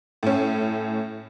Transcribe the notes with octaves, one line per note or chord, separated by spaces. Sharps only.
A2 C#4